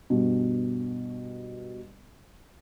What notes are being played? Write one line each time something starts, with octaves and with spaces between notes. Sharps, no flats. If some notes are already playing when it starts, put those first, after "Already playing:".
G2 B2